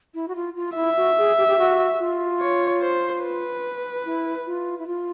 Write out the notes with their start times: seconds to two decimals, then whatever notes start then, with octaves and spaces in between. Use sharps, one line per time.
0.15 E4
0.28 F#4
0.35 F4
0.56 F4
0.76 E4 E5
0.97 F#4
1.18 G#4
1.38 G4
1.48 G4
1.58 F#4
1.99 F4
2.40 C#5
2.82 C5
3.23 B4
4.05 E4
4.47 F4
4.79 E4
4.87 F4